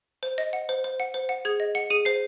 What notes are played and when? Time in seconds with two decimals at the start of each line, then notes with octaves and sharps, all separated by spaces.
0.23 C5
0.38 D#5
0.53 F#5
0.69 C5
0.84 C5
1.00 F#5
1.14 C5
1.29 F#5
1.45 G#4 G#6
1.60 D#5
1.75 F#5 C#7
1.90 G#4 D#7
2.05 C5 C7